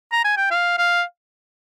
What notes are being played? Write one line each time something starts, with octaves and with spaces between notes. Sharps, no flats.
A#5
G#5
G5
F5
F5